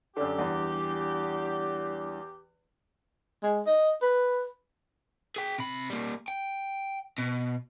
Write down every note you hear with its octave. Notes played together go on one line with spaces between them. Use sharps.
F#2 D3 G4
E2 G3 D4 E4
G#3
D#5
B4
G#4 G5
C3 B5
G3 A#3
G5
B2